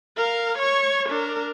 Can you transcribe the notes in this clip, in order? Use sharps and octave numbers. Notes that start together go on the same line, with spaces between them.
A#4 F5
C#5 C#6
D4 A#4